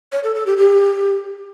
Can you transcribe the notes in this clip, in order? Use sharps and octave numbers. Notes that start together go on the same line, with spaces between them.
C#5
A4
A4
G4
G4